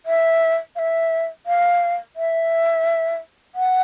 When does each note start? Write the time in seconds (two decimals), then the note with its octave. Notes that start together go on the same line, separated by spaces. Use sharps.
0.06 E5
0.76 F5
0.79 E5
1.46 F5
2.16 E5
3.55 F#5